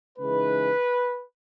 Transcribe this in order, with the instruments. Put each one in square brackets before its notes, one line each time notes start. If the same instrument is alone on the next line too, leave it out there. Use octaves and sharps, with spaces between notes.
[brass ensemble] C#3 E3 G#3 D#4 B4